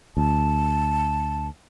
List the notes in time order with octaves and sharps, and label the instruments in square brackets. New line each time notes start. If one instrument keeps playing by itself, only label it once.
[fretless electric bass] D2 [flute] A5